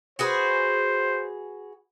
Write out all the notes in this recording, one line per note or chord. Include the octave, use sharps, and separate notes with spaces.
F#4 G#4 B4 C5